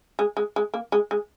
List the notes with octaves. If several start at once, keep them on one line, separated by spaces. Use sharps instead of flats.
G#3
G#3
G#3
A#3
G#3
G#3